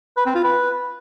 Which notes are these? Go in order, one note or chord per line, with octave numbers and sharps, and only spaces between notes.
B4
C4
F4
B4